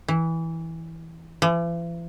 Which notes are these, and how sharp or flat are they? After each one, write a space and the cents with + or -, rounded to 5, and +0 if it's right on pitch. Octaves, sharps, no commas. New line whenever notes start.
E3 -10
E3 +45